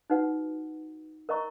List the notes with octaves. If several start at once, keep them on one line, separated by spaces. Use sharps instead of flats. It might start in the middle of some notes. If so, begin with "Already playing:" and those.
D#4 F#4 B4 F#5
A#4 D#5 A#5 C#6